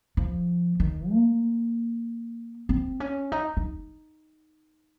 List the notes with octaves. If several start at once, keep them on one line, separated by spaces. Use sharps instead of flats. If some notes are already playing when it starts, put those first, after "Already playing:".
F3
D#3
A#3
C4
C#4
D#4
D#4